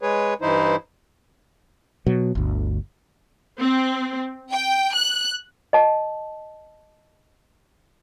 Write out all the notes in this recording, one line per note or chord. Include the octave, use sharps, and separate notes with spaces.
G#3 G#4 B4 C#5
G2 E3 D#4 E4 C5
B2 F#3
G1 D2
C4
G5
F#6
D#5 A5